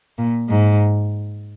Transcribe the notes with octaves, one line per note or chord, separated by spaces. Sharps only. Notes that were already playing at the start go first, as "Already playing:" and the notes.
A#2
G#2